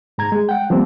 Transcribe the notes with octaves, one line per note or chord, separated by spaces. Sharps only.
G#2 A#5 G#6
G#3
F#5 G5
F3 G3 A#3 C4